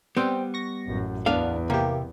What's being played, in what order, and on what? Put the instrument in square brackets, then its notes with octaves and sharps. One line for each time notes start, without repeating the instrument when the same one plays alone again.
[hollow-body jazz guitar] G3 B3 [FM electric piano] C4 G5
[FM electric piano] C#6 A#6
[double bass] A1 F#2
[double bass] E2 [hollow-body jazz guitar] B3 A#4 F5 [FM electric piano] D4
[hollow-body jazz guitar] C3 [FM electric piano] A#3 G4